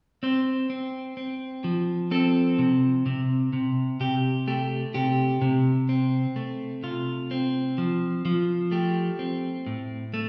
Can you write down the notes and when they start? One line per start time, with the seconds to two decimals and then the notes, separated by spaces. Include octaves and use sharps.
0.23 C4 C5
0.70 C4
1.17 C4
1.64 F3
2.11 C4 A4
2.59 C3
3.06 C3
3.53 C3
4.00 C3 G4
4.48 A3 G4
4.94 C3 G4
5.42 C3
5.89 C4
6.36 A3
6.83 C3 F4
7.31 C4
7.78 F3
8.25 F3
8.71 A3 G4
9.19 C4
9.67 A2
10.14 A3